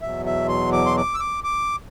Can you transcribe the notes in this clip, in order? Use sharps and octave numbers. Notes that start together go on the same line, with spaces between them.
E2 B2 F#3 E5
E5
C6
D6
C6
D6
E6
D6
D6